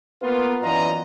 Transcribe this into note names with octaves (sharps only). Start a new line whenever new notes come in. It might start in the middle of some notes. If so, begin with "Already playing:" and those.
A#3 B3 F4
F#2 E3 F4 D5 D#5 A#5